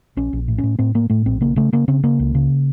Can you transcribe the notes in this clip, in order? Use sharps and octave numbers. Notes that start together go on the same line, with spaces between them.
A#1 C#4
A#1
A2
C#4
A2
A2 C4
A2 A#3
A2 A3
A#1 C4
C#3 A#3
C#3 A3
C#3 A#3
C#3 C4
C#3 A#3
C#2
C#3